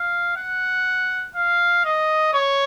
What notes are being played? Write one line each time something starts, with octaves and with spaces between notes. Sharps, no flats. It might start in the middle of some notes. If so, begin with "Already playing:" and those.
Already playing: F5
F#5
F5
D#5
C#5